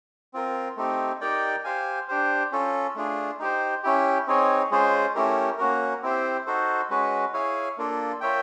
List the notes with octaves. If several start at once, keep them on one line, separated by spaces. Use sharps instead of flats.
C4 F4 A#4
A3 C4 D#4 G4
D#4 G4 A#4 D5 G5
G4 C5 F5 G#5
D4 G4 C5
C#4 F4 A4
A3 D4 F4 G#4
D#4 G4 C5
C#4 E4 G4
C4 D#4 G#4 C#5
G#3 C#4 F4 G#4 C5
A3 C#4 E4 G4 A#4
A#3 C#4 F#4 A#4
C4 E4 G4 C5
D#4 F#4 A4 C5
G#3 C#4 F#4 B4
E4 G#4 C#5 F5 G#5
A#3 D4 F4 A4
F4 A#4 C#5 E5 G5